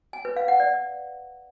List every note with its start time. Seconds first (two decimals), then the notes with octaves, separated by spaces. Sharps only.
0.13 G#5
0.25 B4
0.36 F5
0.48 F#5
0.60 D5